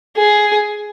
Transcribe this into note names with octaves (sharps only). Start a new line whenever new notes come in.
G#4